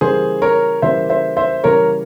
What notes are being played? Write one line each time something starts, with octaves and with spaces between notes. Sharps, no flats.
C#3 E3 G3 A#3 G#4 C5
A#4 C#5
C#3 E3 G3 A#3 C5 E5
C5 E5
C5 E5
C#3 E3 G3 A#3 A#4 C#5